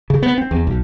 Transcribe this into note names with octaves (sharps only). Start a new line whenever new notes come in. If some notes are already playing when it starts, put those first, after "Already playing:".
C#3
B3
C4
E2
B1